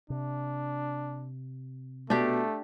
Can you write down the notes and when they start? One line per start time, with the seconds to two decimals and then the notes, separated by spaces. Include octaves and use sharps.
0.10 C3 D4
2.10 B2 A3 D4 G4